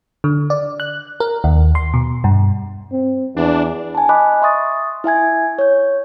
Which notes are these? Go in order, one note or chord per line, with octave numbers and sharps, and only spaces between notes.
D3
D5
F#6
A#4
D#2
C6
B2
G2
C4
E2 D4
G#5 A5
D#5 G#5 B5 D6 F#6
E5 C6 C#6 D#6 A6
E4 E5 G#5 G#6
C#5 G6